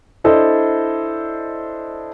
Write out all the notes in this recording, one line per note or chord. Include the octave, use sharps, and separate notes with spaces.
D4 E4 A4 C5 D5 D#5